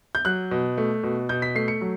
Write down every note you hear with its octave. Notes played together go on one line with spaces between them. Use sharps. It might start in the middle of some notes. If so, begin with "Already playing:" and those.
G6
F#3 F#6
B2
A3
B2
B2 G6
B6
A3 C7
C#7
F#3